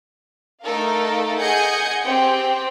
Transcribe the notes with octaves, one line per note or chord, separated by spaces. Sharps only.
A3 D#4 A4 A#4 F5
G#4 D#5 F#5 G#5 G6 C#7
C4 G4 G5